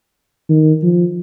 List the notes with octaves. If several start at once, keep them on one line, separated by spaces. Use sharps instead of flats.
D#3
F3